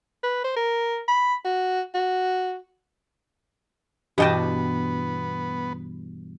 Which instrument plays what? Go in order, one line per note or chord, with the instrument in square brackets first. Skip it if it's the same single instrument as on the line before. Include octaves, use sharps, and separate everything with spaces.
[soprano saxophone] B4
C5
A#4
B5
F#4
F#4
[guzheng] G2 B2 G5 [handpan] E3 [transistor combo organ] B3 [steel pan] G4 D#5 A5